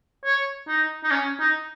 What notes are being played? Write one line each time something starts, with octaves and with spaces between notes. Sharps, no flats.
C#5
D#4
D#4
C#4
D#4